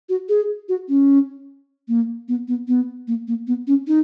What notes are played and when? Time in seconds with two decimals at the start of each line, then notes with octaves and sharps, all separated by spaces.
0.09 F#4
0.29 G#4
0.69 F#4
0.89 C#4
1.88 A#3
2.28 B3
2.48 B3
2.68 B3
3.08 A#3
3.28 A#3
3.47 B3
3.67 C#4
3.87 D#4